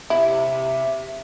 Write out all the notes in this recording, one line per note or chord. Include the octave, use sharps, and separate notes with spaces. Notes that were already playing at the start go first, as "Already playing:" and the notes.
C3 E4 E5